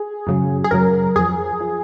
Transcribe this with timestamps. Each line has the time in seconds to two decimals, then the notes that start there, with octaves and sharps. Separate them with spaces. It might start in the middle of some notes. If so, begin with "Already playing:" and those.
Already playing: G#4
0.27 F#2 C#3 F#3
0.64 G#4
0.71 F#2 C#3 F#3 A#4
1.16 F2 F3 G#4
1.61 F3